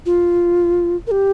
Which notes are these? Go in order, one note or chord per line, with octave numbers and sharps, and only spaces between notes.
F4
A#4
G4